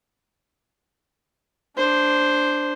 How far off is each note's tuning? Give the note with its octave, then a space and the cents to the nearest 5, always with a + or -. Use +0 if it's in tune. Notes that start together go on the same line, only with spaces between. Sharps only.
D4 +0 C5 +0